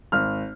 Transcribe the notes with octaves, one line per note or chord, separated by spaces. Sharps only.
G#1 F6